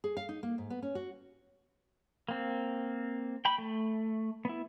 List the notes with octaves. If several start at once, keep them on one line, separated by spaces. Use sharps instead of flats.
G#4
F5
D#4
A#3
G#2
B3
C#4
F#4
A#3 C4
G5 B5
A3
B3 E4